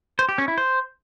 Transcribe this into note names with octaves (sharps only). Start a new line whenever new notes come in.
C5
G4
C#4
E4
C5